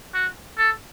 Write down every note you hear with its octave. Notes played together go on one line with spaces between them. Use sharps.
F#4
A4